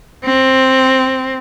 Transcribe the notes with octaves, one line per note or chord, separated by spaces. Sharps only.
C4